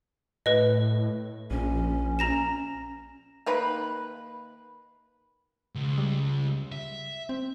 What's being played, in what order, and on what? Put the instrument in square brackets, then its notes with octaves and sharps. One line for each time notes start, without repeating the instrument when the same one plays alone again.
[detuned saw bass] A2 [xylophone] B4 D#5
[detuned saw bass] A#1 [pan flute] C#4
[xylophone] A#5 A#6 E7
[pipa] D#3 A#3 B4 B5
[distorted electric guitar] C#2
[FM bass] G3
[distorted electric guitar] E5
[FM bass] C4